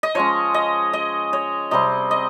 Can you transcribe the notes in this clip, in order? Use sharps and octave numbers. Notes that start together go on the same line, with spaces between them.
D#5
F3 G#3 C#4 C#5
D#5
D#5
C#5
C3 G3 C4 D#5
D#5